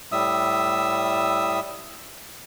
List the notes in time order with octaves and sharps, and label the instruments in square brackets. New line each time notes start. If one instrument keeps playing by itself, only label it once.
[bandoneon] A2 G3 E5 D#6 E6